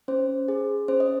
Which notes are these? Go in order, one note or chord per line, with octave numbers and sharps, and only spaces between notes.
C#4 C5
G#4
C#4 C5
D#5